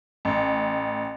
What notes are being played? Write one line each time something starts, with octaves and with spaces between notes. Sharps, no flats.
A1